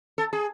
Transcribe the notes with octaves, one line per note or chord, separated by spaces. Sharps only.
A4
G#4